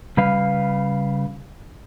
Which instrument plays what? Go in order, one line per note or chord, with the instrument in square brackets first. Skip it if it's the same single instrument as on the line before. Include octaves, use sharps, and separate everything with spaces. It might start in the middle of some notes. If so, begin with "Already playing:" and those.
[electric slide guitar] C#3 G3 B4 F5